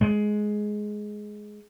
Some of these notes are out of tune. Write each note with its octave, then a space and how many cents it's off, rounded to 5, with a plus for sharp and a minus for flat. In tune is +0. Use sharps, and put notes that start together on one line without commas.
G#3 +10